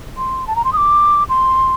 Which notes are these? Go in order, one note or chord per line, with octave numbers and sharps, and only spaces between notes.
C6
A5
A#5
C6
D#6
D6
C6